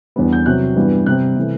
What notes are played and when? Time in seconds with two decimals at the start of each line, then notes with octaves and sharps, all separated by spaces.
0.16 E2 D3 G3 B3
0.33 G6
0.46 C3 F#3 C4 F#6
0.76 G2 E3 G3 B3
1.06 C3 G3 C4 F#6
1.36 C3 E3 A3